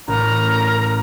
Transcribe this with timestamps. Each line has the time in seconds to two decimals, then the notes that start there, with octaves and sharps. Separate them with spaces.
0.08 A1 A#4 A#5